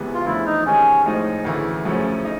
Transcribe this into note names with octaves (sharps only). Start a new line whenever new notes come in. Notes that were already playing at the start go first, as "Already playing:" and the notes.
Already playing: C#2 C3 E3 G#3 B3
F4
E2 C#3 F3 A3 D4 E4
D#4
C3 D#3 G#3 C#4
A2 F3 G#3 C4 D#4
D2 C#3 E3 A3
F#2 C#3 F3 A3 C#4
D#4